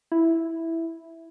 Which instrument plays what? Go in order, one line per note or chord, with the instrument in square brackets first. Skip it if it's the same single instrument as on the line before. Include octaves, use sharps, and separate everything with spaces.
[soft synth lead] E4